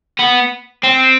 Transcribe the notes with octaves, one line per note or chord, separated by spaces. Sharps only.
B3
C4